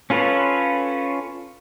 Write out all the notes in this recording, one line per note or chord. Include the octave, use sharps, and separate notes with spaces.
C#4 F4 A4 B4 C#5